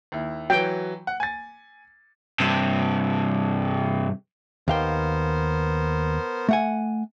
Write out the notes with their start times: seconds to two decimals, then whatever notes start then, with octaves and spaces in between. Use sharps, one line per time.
0.12 D#2 E4
0.50 E3 F#3 G5
1.07 F#5
1.20 G#5 A6
2.40 G2 C3
4.68 D#2 B3 A#4 C5 F5 G5
6.49 A3 F#5 G#5